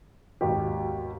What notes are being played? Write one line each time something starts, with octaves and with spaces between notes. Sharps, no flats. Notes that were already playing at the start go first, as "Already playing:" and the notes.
G#1 D#2 B2 G4